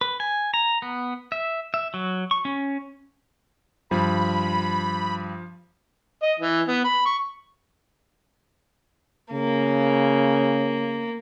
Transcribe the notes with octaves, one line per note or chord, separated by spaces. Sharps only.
B4
G#5
A#5
B3
E5
E5
F#3
C#6
C#4
G2 F3 B5
D#5
E3
B3
B5
C#6
C#3 A#3